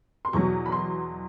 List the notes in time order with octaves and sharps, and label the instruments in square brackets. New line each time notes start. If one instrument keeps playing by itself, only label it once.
[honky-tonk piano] C6
E2 B2 F#3 C#6
B5
C6